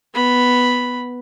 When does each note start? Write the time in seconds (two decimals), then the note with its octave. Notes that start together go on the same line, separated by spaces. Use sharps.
0.14 B3 B5